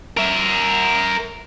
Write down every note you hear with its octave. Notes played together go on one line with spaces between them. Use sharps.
A#4 E5